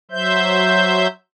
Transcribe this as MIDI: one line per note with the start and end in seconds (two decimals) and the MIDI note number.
0.11 1.07 54
0.11 1.07 72
0.11 1.07 76
0.11 1.07 91